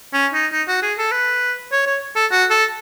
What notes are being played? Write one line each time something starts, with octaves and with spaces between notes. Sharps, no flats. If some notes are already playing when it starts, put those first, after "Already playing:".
C#4
D#4
D#4
F#4
G#4
A4
B4
C#5
C#5
A4
F#4
A4